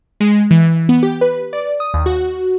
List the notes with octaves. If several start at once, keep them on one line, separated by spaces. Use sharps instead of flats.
G#3
E3
B3
G4
B4
D5
D#6
D#2
F#4